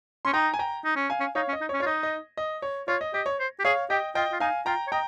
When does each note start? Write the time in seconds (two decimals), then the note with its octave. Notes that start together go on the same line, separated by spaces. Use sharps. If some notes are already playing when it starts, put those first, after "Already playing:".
0.25 C#4 C6
0.33 D#4 G5 A#5
0.54 G#5
0.59 G5 A#5
0.84 D#4
0.96 C#4
1.10 F5 G#5
1.20 C#4
1.35 D#4 C#5 F5
1.48 C#4
1.53 D#5
1.61 D#4
1.69 C#5
1.74 C#4
1.80 F4 C#5
1.86 D#4 D#5
2.03 D#5
2.37 D#5
2.62 C#5
2.88 F4 C#5
3.01 D#5
3.14 G4 D#5
3.26 C#5
3.39 C5
3.59 G4
3.64 G#4 C#5 F5
3.90 G4 D#5 G5
4.15 F4 D#5 G5
4.32 F4
4.40 D#4 F5 G#5
4.66 F4 G5 A#5
4.87 C#5
4.92 D#5 G5 A#5